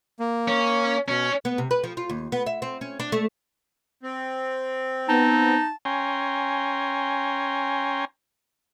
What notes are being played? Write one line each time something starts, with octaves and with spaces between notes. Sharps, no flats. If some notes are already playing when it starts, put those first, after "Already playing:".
A#3
C#4
B2 C#4
B3
C3
B4
F3
F4
D#2
B3
E5
C4
C#4
D4
A3
C4
B3 D#4 A5
C#4 G5 G#5 A#5 C6